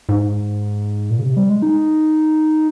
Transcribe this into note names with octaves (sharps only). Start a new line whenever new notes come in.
G#2
A#2
C#3
C3
G3
G#3
D#4